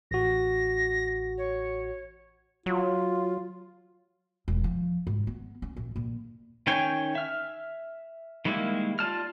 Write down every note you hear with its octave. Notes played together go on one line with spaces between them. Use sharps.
A1 F#4 A#6
C#5
F#3 F4
E1
F3
G#2
B3
C#4
A#1
A#1
D#3 C#4 G5 G#5
E5 F6
D#3 G3 G#3 A#3 E4
F4 D5 A5 F6